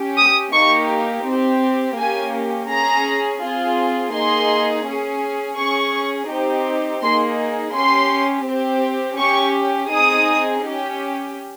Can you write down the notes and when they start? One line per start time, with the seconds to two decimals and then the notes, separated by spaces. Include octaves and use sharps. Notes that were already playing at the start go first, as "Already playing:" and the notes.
Already playing: C#4 G4
0.18 D#6
0.53 A#3 D#4 G4 C#6
1.26 C4 G4
1.97 A#3 C#4 G4 G#5
2.70 C#4 G#4 A#5
3.41 C4 F4 G#4
4.14 A#3 D#4 G#4 C6
4.86 C#4 G#4
5.58 C#4 G#4 C#6
6.30 C4 D#4 G4
7.03 A#3 D#4 G#4 C6
7.75 C#4 G4 C6
8.47 C4 G4
9.18 C#4 G4 C#6
9.90 C4 D#4 G#4 D#6
10.63 C#4 G4